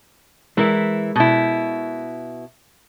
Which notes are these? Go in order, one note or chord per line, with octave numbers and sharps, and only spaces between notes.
E3 G#3 E4 A#4
B2 E4